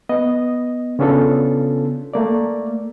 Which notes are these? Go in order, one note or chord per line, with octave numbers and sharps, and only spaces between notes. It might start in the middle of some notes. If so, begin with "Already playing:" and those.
B3 D#5
C#3 B3 C#4 D4 F4 A4
A3 A#3 D5